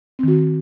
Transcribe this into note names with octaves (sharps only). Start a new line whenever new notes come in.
D#3 C4 F#4